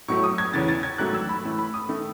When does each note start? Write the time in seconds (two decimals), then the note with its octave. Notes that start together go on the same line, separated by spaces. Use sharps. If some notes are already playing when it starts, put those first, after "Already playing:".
0.08 A2 F#3 A3 C#6
0.24 D#6
0.38 G#6
0.53 E2 C#3 E3 A6
0.68 A6
0.83 G#6
0.98 G#2 D#3 F#3 A3 F#6
1.14 E6
1.29 B5
1.44 A2 E3 A3
1.59 B5
1.74 D#6
1.89 D#3 A3